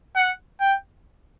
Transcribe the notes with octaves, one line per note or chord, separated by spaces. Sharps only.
F#5
G5